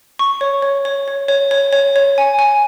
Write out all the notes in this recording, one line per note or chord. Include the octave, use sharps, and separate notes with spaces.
C#6
C#5
C#5
C#5
C#5
C#5
C#5
C#5
C#5
G#5
G#5